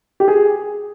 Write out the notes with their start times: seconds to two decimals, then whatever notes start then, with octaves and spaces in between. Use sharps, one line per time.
0.20 G4
0.28 G#4